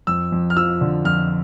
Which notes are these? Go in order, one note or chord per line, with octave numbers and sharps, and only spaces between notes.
F2 E6
F2
F6
F3 E6
D3
F2 F6